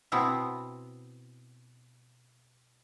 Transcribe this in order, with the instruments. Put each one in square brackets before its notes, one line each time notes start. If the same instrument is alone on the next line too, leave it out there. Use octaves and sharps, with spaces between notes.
[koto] B2 B3 C4 E4